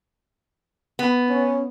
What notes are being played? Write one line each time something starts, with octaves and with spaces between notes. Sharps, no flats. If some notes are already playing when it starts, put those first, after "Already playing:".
B3
C#4